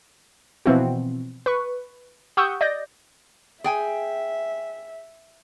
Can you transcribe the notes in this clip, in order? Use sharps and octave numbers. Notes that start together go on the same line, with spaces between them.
B2 E3 F3 C4 E4 F#4
B4 C#6
G4 F#5 C#6 D#6 E6 G6
D5 D#5 G6 A#6
G#4 E5 G5 G#5